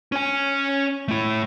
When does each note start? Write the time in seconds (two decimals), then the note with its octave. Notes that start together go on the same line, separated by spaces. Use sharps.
0.12 C#4 G#5
1.08 A3 E4